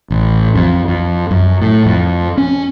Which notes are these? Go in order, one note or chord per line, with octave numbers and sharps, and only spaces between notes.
A1
F2
F2
F#2
A2
F2
C#4